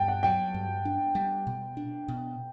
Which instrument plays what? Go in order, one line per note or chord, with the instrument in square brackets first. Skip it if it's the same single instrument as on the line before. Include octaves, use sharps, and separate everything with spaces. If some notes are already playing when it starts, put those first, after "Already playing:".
Already playing: [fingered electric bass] G2 [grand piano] G5 A5
[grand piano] F#5
[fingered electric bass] F#3 [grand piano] G5
[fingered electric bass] G2
D4
G3
B2
D4
B2